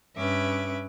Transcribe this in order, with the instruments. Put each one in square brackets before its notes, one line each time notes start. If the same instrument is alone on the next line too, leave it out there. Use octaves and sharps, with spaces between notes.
[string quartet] G2 C#4 B4 E5 D6